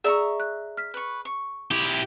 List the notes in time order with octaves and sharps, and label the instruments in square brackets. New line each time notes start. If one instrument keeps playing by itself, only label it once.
[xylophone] G#4 D5 E6 [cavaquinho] E5 A#5 C#6
[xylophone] F#6
F6 B6
[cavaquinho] B4 C#6
C#6
[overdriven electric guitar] E4 G4